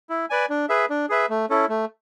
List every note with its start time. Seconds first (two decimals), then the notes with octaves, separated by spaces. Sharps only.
0.10 E4
0.30 B4 D5 G#5
0.50 D4
0.69 G#4 B4 E5
0.90 D4
1.09 G#4 B4 E5
1.30 A3
1.49 C#4 E4 A4
1.69 A3